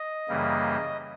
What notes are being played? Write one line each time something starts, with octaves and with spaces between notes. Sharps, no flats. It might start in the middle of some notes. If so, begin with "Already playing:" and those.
Already playing: D#5
F#2 C#3 E3 G3 A#3